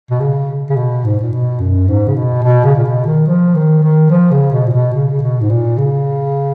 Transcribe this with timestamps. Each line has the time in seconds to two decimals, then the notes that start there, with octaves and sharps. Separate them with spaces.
0.11 B2
0.20 C#3
0.70 C#3
0.77 B2
1.05 G#2
1.21 A#2
1.32 B2
1.60 F#2
1.88 G#2
2.08 C#3
2.16 B2
2.43 B2
2.64 C#3
2.76 A#2
2.85 B2
3.06 D#3
3.27 F3
3.55 D#3
3.83 D#3
4.10 F3
4.31 C#3
4.52 B2
4.66 A#2
4.73 B2
4.94 C#3
5.11 C#3
5.22 B2
5.41 G#2
5.50 A#2
5.78 C#3